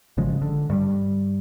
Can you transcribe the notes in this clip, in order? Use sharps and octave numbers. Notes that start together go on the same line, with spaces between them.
G#1 C#3 F3 G#3
D3
G2 G3